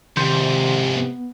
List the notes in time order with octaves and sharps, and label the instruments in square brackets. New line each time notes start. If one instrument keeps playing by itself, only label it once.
[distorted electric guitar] F2 G#2 [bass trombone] C3 [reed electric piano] D#3 C6 G6
[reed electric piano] B3